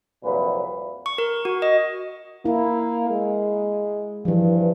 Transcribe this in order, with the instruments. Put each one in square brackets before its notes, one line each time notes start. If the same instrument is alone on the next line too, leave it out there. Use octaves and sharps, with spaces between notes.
[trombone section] C2 F2 A#2 F#3 B4
[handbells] C#6
A#4
F#4
D#5
[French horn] A#3 [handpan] E4
[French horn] G#3
[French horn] G2 [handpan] E3 F3